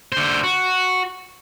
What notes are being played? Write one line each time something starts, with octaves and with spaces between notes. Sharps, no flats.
D3 C5
F#4